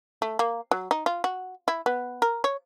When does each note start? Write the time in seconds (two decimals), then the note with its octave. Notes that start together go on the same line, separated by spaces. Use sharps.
0.22 A3
0.39 A#3
0.71 F#3
0.91 D#4
1.06 F4
1.24 F#4
1.68 E4
1.86 B3
2.22 A#4
2.44 C#5